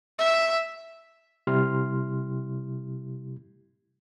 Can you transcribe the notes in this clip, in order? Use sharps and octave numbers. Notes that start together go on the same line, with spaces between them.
E5
C3 G3 E4 G4 C6 F6